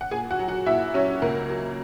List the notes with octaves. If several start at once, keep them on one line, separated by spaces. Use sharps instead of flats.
F#5
A#2 G#4 G#5
F#4 F#5
F#3
F#4 F#5
A#2 E4 E5
F#3 C#4 C#5
C#2 A#3 A#4
F#3